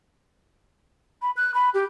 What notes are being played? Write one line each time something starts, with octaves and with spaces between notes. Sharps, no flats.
B5
F#6
B5
G4